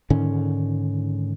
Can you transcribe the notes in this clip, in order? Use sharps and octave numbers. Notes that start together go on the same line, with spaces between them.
G#2 D3 D#3 C#4